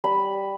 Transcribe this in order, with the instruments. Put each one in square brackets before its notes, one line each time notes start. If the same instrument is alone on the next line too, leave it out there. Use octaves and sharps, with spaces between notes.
[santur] G3 B5